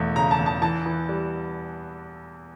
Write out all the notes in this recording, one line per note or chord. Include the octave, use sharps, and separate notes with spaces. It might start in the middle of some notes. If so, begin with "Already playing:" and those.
Already playing: E1 E2 A3
C#3 A#5
A5
E2
A5
E3 A5
E3
G3